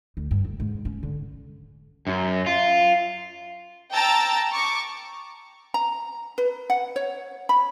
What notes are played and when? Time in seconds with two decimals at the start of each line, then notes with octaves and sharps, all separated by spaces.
0.17 D2
0.31 G2
0.44 D2
0.60 G#2
0.85 C#4
1.03 D3
2.07 F#2
2.46 F4
3.92 G5 A5 A#5 E6 A6
4.52 C#6 D6
5.74 A#5
6.38 B4
6.70 F#5
6.96 C#5
7.49 B5